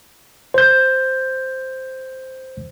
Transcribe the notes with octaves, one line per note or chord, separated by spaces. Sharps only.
C5 G6